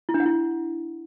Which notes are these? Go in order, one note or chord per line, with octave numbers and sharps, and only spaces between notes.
E4
D4
F#5
E4